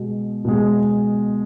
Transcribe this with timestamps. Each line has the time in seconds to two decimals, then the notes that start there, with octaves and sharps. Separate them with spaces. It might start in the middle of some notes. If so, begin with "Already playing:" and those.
Already playing: B2 G#3
0.45 B2 G#3